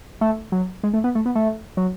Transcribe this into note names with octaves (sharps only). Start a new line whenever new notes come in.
A3
F#3
G#3
A3
B3
A3
B3
A3
F#3